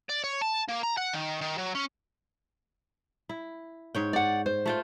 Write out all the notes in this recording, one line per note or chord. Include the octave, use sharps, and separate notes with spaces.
D5
C#5
A5
A#3
A#5
F#5
D#3
D#3
F#3
C#4
E4
G#2 C#5 G5
D5 F#5
C5
A3 F4 G5